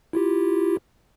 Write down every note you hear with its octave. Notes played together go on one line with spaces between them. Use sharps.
E4 F4 G4